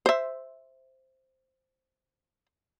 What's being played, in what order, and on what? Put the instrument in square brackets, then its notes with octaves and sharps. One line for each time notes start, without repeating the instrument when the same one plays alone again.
[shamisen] C5 E5